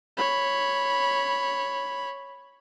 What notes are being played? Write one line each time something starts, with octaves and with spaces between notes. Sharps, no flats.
C#5 B5